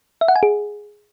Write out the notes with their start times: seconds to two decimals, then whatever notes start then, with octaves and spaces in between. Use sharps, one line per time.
0.21 E5
0.28 F#5
0.36 G#5
0.43 G#4